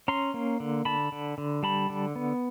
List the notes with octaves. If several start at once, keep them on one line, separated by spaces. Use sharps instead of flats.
C#4 A#5 C6
A#3
D3
D3 A5 B5
D3
D3
G3 A5 B5
D3
B3